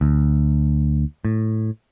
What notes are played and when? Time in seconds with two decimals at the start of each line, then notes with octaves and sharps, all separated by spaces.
0.01 D2
1.25 A2